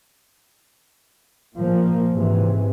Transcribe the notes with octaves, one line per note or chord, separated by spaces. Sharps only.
A#2 F3 A#3
G#2 C3 E3